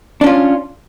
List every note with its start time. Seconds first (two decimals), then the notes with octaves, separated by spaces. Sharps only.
0.21 D4
0.24 C#4
0.27 F4